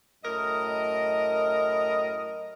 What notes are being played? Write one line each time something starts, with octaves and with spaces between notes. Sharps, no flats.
F#2 A2 A#4 D#5